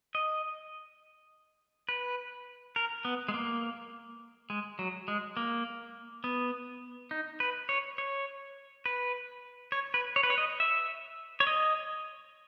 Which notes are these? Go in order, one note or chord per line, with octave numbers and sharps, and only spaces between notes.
D#5
B4
A#4
B3
G#3
A#3
G#3
F#3
G#3
A#3
B3
D#4
B4
C#5
C#5
B4
C#5
B4
C#5
B4
C#5
D#5
E5
C#5
D#5